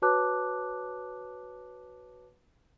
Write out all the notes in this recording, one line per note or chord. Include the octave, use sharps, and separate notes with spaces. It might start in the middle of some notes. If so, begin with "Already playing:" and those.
F#4 B4 C#5 A5 D6 F#6